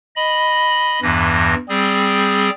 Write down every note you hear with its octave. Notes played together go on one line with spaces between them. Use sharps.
D#5 B5
E2 G2 E3 A#6
G3 C4 G#4